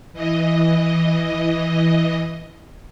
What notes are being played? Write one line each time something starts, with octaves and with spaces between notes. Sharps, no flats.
E3 D#5